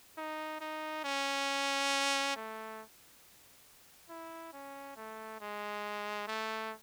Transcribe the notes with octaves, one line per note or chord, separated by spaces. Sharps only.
D#4
D#4
C#4
A3
E4
C#4
A3
G#3
A3